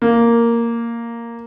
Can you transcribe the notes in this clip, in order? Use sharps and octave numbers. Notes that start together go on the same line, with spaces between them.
A#3